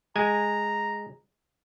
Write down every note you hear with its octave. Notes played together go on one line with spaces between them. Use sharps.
G#3 G#5 A#5